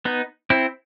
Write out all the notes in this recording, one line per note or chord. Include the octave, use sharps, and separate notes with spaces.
B3 D#4
C4 E4